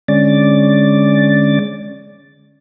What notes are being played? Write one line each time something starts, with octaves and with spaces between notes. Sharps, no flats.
D3 G#3 C#4 D5 A6